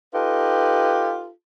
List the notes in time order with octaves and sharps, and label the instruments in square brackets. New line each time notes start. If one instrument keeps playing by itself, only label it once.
[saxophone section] D#4 F4 G4 A4 B4